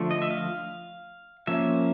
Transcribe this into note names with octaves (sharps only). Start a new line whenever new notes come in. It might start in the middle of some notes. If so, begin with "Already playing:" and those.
Already playing: D3 F3 A3
D#5
E5
F5
F3 A#3 C#4 E5